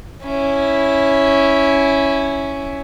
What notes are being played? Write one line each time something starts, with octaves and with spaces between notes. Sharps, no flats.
C#4 E4